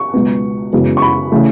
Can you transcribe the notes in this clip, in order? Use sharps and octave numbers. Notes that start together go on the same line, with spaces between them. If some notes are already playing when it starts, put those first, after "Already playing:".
Already playing: C#6
C#2 B2 F#3 B3
F#2 C#3 E3 G#3 B3
C#6
B5
C#3 E3 A3